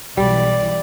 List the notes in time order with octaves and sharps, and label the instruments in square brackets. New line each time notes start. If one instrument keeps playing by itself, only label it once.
[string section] B1 E3 [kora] G3 [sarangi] D5